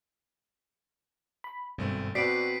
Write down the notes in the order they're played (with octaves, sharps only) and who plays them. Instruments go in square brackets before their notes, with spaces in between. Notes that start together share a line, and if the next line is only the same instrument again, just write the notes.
[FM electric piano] B5
[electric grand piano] G#1 A3 C4 [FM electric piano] G2 B2
[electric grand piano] B2 C4 B4 [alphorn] F#4 [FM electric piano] D5 [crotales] B6 C7 D7